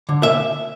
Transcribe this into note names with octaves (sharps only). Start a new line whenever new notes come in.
D3
E5